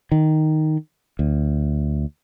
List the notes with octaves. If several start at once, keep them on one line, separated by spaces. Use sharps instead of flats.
D#3
D2